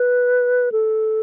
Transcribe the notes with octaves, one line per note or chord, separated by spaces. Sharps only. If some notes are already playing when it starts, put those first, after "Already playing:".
Already playing: B4
A4